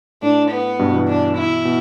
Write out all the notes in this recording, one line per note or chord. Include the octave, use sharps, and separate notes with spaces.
A2 D4
B3
G2 B2
B2 E3
D4
E4
B2